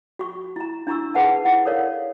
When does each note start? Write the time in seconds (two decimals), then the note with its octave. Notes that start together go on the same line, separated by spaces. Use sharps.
0.19 F#4 C#6
0.56 E4 A#5
0.87 D4 E4 A#5 C#6 E6
1.14 D#4 G#4 B4 F#5 A5
1.45 E4 F#5
1.65 A4 A#4 C#5 D5 F5